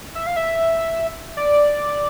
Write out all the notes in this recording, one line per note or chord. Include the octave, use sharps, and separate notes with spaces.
E5
F5
E5
D5